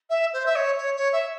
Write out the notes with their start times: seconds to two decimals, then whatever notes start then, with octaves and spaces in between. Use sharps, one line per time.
0.10 E5
0.33 C5
0.46 E5
0.55 C#5
0.78 C#5
0.96 C#5
1.12 E5